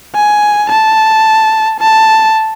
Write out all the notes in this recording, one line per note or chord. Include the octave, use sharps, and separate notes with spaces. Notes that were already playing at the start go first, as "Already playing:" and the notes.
G#5
A5
A5